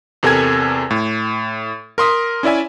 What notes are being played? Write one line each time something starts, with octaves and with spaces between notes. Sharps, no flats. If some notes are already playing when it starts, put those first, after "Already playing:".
E2 C3 A4 A#4 G#5 G#6
A2
A#4 C6 D#6 B6
C#4 E4 D5 E5 G#5